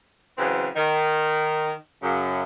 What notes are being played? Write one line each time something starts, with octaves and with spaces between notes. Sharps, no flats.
C#3 E3 F#3 C4
D#3
F#2 C#3